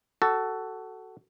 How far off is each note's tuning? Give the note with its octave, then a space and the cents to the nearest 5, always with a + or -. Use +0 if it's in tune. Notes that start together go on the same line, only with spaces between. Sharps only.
F#4 +20 A4 +5